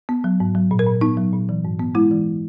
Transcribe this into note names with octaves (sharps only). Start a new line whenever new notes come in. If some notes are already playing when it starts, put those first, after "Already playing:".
B3
F#3
G#2
F#3
A#2
A#4
A#2
B3 D#4
F#3
A#2
E3
G#2
B3
G#3 E4
E3